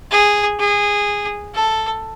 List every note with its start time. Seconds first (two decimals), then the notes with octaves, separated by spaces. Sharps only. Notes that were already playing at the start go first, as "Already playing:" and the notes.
0.11 G#4
0.59 G#4
1.54 A4